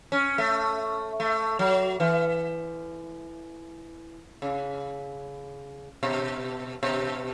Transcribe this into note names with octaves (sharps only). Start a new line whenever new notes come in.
C#4
A3
A3
F#3
E3
C#3
B2
B2